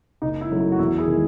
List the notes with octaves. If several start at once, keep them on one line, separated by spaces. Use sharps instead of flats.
F#1 D#4
E4
F#2 C#3 F#3 A3
E4
F#4
E2 E4
E4 G#4
D#3 G#3